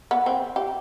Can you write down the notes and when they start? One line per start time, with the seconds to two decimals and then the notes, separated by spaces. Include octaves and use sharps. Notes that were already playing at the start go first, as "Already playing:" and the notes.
0.11 B3
0.26 C4
0.56 G4